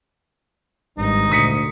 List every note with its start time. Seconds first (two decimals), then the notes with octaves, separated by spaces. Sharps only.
0.98 G#1 G2 D#4
1.32 D2 A#2 D#6 B6 C#7